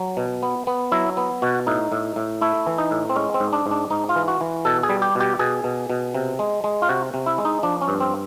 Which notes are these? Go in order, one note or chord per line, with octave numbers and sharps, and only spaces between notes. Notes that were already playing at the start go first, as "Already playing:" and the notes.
Already playing: F#3
B2
B3
B3
F#3 E4
B3
B2 F#4
A2 D#4
A2
A2
A3 E4
E3
D#4
A2
C4
G#3 C#4
C4
G#2
D4
G#2
D4
G#2 D#4
F4
E3
F#4
E3
B2 A4
G#4
G3
G4
B2
G4
B2 G#4
B2
B2
C3
G#3
G#3
F4
C3 F#4
C3
E4
G#3
D#4
F3 D4
C#4
G2
C4